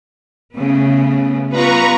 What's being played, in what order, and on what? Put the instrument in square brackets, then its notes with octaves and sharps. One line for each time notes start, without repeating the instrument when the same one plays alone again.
[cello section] C#3 A3 B3
[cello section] G3 B3 F4 [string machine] B4 A#5 C#6